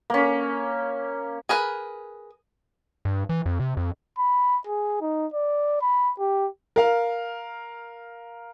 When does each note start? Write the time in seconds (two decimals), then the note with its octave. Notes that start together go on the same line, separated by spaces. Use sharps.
0.10 A#3 C#4
1.49 G#4 A#4 B4
3.05 G2
3.29 E3
3.46 F2
3.60 C3
3.77 F2
4.19 B5
4.67 G#4
5.01 D#4
5.34 D5
5.82 B5
6.19 G4
6.76 A#4 F5